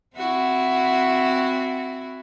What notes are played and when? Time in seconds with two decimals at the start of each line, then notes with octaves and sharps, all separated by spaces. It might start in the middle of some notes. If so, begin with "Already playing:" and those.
0.17 C4 E4 F#4